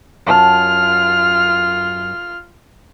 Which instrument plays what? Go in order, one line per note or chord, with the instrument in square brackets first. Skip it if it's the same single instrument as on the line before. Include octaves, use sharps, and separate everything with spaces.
[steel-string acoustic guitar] F#2 A5 [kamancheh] F4 F6